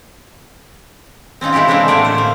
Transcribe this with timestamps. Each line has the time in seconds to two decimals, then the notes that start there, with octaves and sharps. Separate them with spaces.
1.41 C4 C#4 D#4 F4
1.53 E3 G#3 E4 F4 G4
1.68 C3 G#3 A#3 C4 D4 A4
1.88 A2 D3 A3 A#3 D5
2.05 C5
2.18 A#3